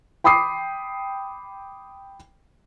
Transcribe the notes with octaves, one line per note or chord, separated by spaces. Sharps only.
G5 B5 D6 D#6 C7